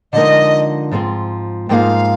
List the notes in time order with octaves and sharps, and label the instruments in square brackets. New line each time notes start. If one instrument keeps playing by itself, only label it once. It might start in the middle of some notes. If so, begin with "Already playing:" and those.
[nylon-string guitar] D3 F3 G#3 D#4 A#4 [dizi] D#5
[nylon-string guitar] G#2 F3 G#3 C4
[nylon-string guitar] G#2 F3 A#3 D#4 G#4 [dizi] F5 G5